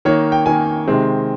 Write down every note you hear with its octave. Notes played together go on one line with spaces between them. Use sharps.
D#3 A#3 C#5
G5
D#3 A#3 G#5
C3 D#3 G#3 C4